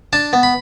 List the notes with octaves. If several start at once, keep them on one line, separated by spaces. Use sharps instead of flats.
D4 A5
B3
B5